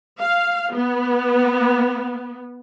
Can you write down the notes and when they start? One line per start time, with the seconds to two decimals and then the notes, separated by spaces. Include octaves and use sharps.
0.20 F5
0.73 B3